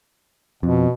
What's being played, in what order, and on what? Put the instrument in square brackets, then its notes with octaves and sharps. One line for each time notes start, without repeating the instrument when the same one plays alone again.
[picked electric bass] F2 [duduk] B2